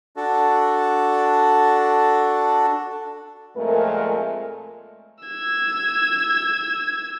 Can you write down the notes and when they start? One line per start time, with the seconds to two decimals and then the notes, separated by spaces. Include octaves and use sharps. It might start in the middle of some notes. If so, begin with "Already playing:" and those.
0.16 D4 F#4 A4
3.56 F2 A#2 G#3 A3 A#4
5.24 E6 G#6